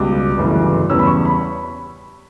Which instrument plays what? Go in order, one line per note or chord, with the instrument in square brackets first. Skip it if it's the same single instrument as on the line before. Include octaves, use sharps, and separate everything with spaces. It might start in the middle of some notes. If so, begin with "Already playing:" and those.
Already playing: [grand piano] C#2 B2 G3 D6
G1 F#2 C#3 E3 A3
E2 C#3 G3 C#4 E6
B5
C#6
B5